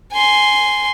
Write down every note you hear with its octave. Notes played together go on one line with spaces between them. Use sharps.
G#5 C6